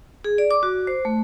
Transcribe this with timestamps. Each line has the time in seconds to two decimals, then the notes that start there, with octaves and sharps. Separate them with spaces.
0.24 G#4
0.38 D5
0.51 D6
0.63 F#4
0.87 C5
1.05 A3